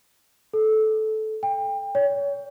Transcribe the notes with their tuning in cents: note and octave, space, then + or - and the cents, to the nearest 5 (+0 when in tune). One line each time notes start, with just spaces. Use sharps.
A4 -15
G5 +30
C#5 +30